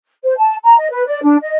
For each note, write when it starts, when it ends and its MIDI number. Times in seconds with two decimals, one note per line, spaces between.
0.23 0.33 72
0.38 0.55 81
0.63 0.76 82
0.78 0.88 75
0.90 1.04 71
1.06 1.22 74
1.23 1.36 62
1.41 1.58 75